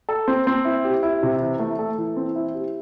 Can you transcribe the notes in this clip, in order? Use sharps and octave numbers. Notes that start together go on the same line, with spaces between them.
A4
C4
C4
E4
G4
E4
C3
E3
A3
A4
E3
C4
E4
G4